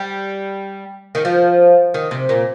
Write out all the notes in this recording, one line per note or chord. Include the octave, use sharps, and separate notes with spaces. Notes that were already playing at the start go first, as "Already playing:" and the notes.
Already playing: G3
D#3
F3
D#3
C3
A#2